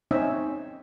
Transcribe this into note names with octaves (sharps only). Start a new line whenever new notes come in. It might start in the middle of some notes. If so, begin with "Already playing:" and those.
C4 C#4 D#4 E5